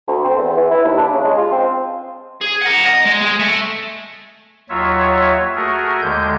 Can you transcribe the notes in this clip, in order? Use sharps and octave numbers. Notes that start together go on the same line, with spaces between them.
D2
C4
E2
E3
E4
D#2
D4
C#3
G#3
F4
C4
G#4
A#4 F#5
D#5
G#3
G#3
A3
D#2 F#3 F4 C#5 E5
A3 F#4 G#4 A#4
D#2 D3 G#3 G6